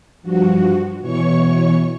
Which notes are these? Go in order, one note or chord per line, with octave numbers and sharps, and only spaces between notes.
G2 F3 F#4
B2 E3 C#5 C#6